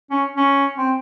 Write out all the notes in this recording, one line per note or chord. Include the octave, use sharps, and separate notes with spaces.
C#4
C#4
C4